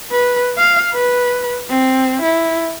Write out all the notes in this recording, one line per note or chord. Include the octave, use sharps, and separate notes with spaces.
B4
F5
B4
C4
E4